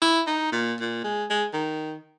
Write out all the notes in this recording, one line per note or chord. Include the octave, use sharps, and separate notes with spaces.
E4
D#4
A#2
A#2
G#3
G#3
D#3